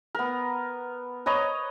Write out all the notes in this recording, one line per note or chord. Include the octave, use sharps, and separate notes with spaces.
B3 A#4
B4 C#5 D#5 A#5